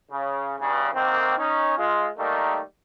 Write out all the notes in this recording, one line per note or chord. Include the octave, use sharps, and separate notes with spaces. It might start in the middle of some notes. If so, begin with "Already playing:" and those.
C#3
E2 G2 C#3
D2 D#3 A#3 C4
C#4 D#4
G#3 F4
D#3 G3 A3 A#3 D#4